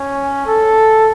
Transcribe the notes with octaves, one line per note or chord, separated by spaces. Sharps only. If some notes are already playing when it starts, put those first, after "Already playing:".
Already playing: C#4
A4